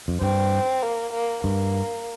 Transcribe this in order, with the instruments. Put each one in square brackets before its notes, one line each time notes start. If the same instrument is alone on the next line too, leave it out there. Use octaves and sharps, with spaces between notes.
[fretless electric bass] F2
[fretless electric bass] G2 [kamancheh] C4
[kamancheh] A#3
A#3
[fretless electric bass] G2 [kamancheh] A#3